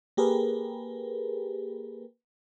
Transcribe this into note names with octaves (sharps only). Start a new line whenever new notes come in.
A#3 G4 G#4 A#4 B4